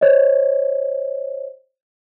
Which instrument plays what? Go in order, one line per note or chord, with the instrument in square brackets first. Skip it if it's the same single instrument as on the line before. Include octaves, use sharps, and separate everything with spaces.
[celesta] C5 C#5 D#5